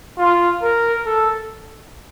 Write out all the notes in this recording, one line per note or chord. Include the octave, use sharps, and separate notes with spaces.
F4
A#4
A4